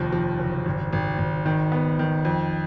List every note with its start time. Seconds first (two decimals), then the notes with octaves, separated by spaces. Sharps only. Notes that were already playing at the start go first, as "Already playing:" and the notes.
Already playing: F1 D#2 F3
0.12 F3
0.39 F#1
0.66 G#1
0.93 G#1
1.18 G#1
1.46 D#3
1.72 B3
1.99 D#3
2.25 F2